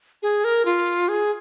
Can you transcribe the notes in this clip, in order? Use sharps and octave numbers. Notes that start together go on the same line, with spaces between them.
G#4
A#4
F4
G#4